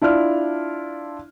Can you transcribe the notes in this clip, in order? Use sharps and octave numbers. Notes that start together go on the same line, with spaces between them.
D4 E4 F4 D5 F6